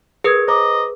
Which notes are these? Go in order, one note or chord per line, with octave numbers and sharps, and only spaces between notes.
G#4 A#4 B4 D#6 G#6
C5 D#5 A#5 D6